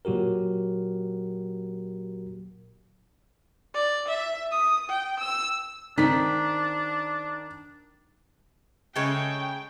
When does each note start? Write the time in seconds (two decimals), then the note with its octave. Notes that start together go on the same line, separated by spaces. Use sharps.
0.05 A#2 F#3 F#4 G4 A#4
3.74 D5
4.07 E5
4.52 D#6
4.90 G5
5.19 E6
5.98 D#3 C4 D4 D#4 B6
8.96 C#3 G#3 A3 A4 C#5 G5